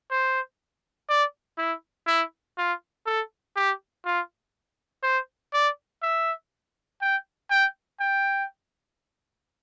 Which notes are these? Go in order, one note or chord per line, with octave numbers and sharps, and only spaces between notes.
C5
D5
E4
E4
F4
A4
G4
F4
C5
D5
E5
G5
G5
G5